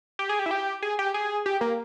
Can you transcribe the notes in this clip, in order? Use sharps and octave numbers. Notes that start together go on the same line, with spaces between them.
G4
G#4
G4
E4
G4
G#4
G4
G#4
G4
A#3